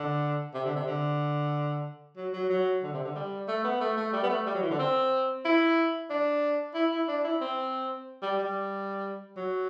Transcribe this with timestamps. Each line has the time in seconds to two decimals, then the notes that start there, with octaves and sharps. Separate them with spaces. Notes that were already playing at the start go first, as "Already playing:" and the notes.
Already playing: D3
0.54 C3
0.65 D3
0.76 C3
0.87 D3
2.17 F#3
2.33 F#3
2.50 F#3
2.83 D3
2.93 C3
3.04 D3
3.16 G3
3.48 A3
3.64 B3
3.81 A3
3.97 A3
4.13 G3
4.23 B3
4.29 A3
4.46 G3
4.54 F#3
4.62 E3
4.70 D3
4.79 C4
5.45 E4
6.10 D4
6.74 E4
6.91 E4
7.08 D4
7.24 E4
7.41 C4
8.22 G3
8.39 G3
9.37 F#3